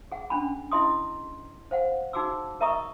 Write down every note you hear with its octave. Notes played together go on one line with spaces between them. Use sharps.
G#4 F#5
C#4 D4 B5
E4 G#4 D#5 C6 D#6
C5 F5 F#5
D#4 F#4 G#4 D6 E6
A#4 D#5 E5 A#5 C#6 D#6